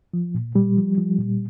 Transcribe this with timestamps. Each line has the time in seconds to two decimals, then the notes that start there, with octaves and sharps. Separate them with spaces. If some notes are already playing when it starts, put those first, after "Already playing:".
0.14 F3
0.35 A#2
0.55 A#2 G3
0.77 F3
0.98 F3
1.19 A#2